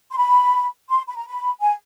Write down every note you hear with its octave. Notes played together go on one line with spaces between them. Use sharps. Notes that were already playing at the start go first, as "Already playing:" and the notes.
C6
B5
C6
B5
A#5
B5
G#5